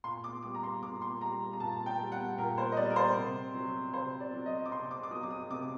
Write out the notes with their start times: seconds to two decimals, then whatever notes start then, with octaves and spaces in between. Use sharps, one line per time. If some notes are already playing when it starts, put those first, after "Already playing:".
0.04 A#2 C6
0.24 D6
0.43 G3 D6
0.55 A#5
0.63 C6
0.83 A#2 D6
1.02 C6
1.21 G3 A#5
1.53 A#5
1.60 A#2 A5
1.86 G5
1.99 G3
2.12 F#5
2.38 A#2 A#4
2.58 C5
2.72 D#5
2.76 G3 D5
2.90 A#4
2.96 C5
3.17 C3
3.55 F#3
3.93 C3 C5
4.20 D5
4.34 F#3
4.46 D#5
4.65 D6
4.72 C3 C6
4.91 D6
5.03 D6
5.11 F#3 D#6
5.23 D6
5.30 D#6
5.50 C3 D6